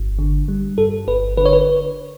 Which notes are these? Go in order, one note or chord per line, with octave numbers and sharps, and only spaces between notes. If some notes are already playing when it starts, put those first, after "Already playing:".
Already playing: G1
D3
G3
G2 A4
G1 B4
D3 B4
C#5
B4